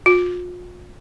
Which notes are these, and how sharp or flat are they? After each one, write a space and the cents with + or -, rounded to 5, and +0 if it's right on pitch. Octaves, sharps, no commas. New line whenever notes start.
F4 +40